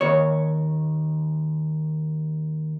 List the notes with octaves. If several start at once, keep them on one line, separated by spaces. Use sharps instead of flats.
D#2 C#5